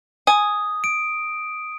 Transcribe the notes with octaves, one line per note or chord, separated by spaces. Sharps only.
G#5 D#6
D7